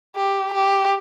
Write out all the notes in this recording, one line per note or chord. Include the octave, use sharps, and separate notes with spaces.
G4
G4